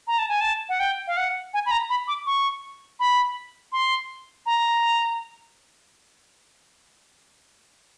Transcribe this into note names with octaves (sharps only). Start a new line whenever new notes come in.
A#5
A5
G#5
A5
F#5
G5
F5
F#5
G#5
B5
A#5
B5
D6
C#6
B5
C6
A#5